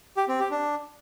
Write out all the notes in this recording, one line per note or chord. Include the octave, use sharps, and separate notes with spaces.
G4
C4
G4
D4